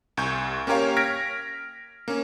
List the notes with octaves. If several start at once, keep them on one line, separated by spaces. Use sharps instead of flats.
C2 C#6 G6
A#3 C#4 G4 A#4 C#5 F5
F6 G#6 A#6 B6 D7
A#3 C#4